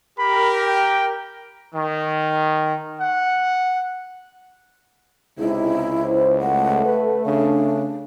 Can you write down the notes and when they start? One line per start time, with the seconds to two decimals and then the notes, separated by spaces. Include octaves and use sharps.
0.19 G4 A#4 B5
0.64 G5
1.74 D#3
2.99 F#5
5.39 C#2 C3 G#3 D#4 E4
6.03 C5
6.41 A3 F#5
6.85 B4
7.26 C#3 D4